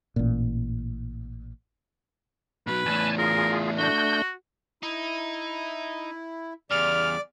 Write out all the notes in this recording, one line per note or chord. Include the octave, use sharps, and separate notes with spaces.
A1 A#2
B2 F#3 B4
E2 A2 G#5 A5
F4 G#4 A#4
A3 D4 F#4 G6
D#4 E4
E2 C#3 G3 D5 F6